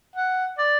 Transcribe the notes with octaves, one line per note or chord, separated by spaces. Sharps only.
F#5
D5